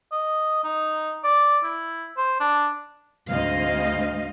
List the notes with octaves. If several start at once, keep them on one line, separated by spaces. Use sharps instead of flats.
D#5
D#4
D5
E4
C5
D4
D2 G#2 C4 D#5 F5